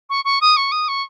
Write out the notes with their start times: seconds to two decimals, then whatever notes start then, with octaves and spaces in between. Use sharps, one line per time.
0.09 C#6
0.24 C#6
0.41 D#6
0.56 C#6
0.71 D#6
0.88 C#6